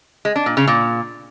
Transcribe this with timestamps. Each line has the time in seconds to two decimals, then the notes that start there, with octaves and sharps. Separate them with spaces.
0.25 G#3
0.36 D4
0.46 A#2
0.57 C#3
0.67 A#2